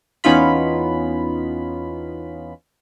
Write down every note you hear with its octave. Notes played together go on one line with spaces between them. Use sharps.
E2 B3 C#4 D#4 F4 B5